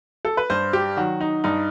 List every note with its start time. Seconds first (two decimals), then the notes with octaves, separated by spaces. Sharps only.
0.25 A4
0.37 B4
0.50 G2 C5
0.73 G4
0.97 D#3 F#3 F#4
1.21 D#4
1.44 G2 D#4